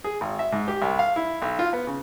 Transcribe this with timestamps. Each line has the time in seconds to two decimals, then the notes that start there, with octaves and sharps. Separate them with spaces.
0.04 G#4
0.21 G#1
0.39 E5
0.52 G#2
0.68 G4
0.82 C2
0.99 F5
1.16 E4
1.42 B1
1.59 F4
1.73 B3
1.87 C#3